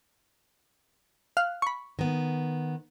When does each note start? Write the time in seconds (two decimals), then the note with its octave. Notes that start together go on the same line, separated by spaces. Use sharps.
1.37 F5 F6 F#6
1.62 B5 C#6
1.99 D#3 B3